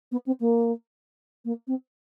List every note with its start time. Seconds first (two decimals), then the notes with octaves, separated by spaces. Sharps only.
0.12 B3
0.26 C4
0.40 A#3
1.45 A#3
1.67 C4